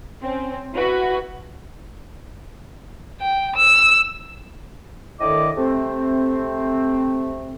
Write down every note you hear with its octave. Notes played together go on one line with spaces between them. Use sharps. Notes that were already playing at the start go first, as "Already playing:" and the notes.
C4 C#4
E4 F#4 B4
G5
E6
A2 D3 D#3 D#5 D6
C3 A3 C4